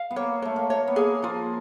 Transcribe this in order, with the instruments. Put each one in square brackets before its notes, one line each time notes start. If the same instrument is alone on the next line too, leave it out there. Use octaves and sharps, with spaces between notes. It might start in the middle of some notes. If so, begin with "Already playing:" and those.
Already playing: [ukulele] F5
[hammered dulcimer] B3
[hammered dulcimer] A#3 [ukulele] C#5
[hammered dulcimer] A3 [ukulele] C#5
[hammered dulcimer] A#3
[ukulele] C#5
[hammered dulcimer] B3
[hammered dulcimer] A#3 [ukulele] G#4
[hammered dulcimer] F3 [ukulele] F4